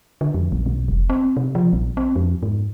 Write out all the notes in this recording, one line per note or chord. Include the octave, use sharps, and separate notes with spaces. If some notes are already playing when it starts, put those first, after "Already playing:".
D3
F2
A#1
B1
F1
C4
C3
F3
A#1
C4
F2
G#2